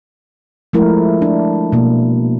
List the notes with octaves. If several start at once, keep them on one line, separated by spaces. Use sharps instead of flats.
F3 G#3 A3 E4 A#4
D4
B2 A#3